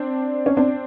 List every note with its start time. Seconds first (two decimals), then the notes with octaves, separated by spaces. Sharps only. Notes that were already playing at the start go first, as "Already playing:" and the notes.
Already playing: C4 D4
0.46 C#4
0.57 C4 D4